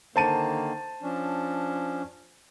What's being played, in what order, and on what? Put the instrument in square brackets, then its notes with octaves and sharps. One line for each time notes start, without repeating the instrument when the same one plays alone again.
[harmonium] D3 D#3 A#3 [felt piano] C5 A5 D#7
[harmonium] F3 C#4 D4